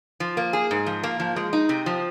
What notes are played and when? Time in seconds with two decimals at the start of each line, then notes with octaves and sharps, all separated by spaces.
0.20 F3
0.37 A#3
0.53 G#4
0.71 G#2
0.86 F3
1.03 A#3
1.20 F3
1.36 G#3
1.53 D#4
1.69 C3
1.86 F3